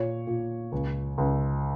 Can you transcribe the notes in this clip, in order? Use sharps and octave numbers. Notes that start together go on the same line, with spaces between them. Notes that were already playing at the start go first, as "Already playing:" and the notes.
Already playing: A#2 C#5
A#2
C#2
C#2